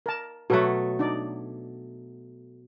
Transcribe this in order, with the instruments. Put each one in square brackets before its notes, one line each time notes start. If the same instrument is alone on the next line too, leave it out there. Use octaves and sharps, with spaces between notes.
[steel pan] A#4 A5
[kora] B2 F#3 A3 [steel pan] F#4 A4 B4
[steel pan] D4 D#4 D5